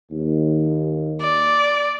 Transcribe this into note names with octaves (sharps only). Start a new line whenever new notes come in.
D#2
D5